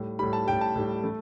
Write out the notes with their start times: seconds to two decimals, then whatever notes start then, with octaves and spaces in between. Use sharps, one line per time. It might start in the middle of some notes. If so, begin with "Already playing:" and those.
Already playing: A2 G3
0.19 A2 G3 B5
0.33 A5
0.47 A2 G3 G5
0.61 A5
0.76 A2 G3
1.04 A3